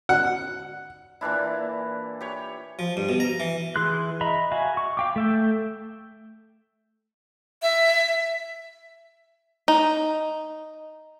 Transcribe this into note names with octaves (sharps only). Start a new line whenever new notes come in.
F#5
A#2 E3 D4 E4
G4 C#5
F3
G2
B2
A#5
E3
E3 G#4 C6 F#6
D#5 E5 A#5 B5
F#4 E5 F5 G#5
C#6
F5 G5 D6
A3 E5 G5
E5
D#4